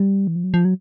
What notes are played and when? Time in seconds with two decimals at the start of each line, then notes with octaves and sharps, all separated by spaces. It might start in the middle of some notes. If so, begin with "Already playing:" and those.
Already playing: G3
0.27 E3
0.36 F3
0.44 F#3
0.54 F3
0.65 F#3